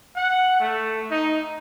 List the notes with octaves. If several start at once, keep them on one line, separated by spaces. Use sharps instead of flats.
F#5
A3
D#4